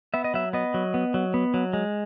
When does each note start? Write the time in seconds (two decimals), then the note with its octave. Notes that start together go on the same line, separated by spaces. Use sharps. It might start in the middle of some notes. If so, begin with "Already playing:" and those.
0.14 B3 E5
0.24 D#5
0.34 F#3 E5
0.53 B3 D#5
0.74 F#3
0.94 B3
1.14 F#3
1.34 B3
1.54 F#3
1.73 G#3